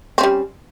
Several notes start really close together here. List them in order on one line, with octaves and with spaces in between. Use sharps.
C4 C#4 G3